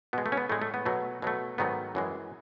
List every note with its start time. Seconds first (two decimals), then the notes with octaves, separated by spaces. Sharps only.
0.13 B2 G#3 B3
0.26 A3
0.32 C#4
0.37 B3
0.49 A2 G#3 A3
0.62 A3
0.74 B3
0.86 B2 F#3 A3
1.22 B2 F#3 A3
1.58 G#2 D#3 F#3 A3 B3
1.95 F#2 E3 G#3